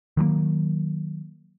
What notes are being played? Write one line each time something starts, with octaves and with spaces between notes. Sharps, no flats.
D#3 F#3 G3 A#3